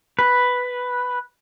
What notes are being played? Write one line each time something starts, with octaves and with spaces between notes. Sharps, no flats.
B4